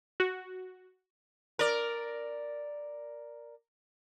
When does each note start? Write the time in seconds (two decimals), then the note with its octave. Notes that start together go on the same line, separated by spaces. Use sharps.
0.20 F#4
1.59 A#4 D5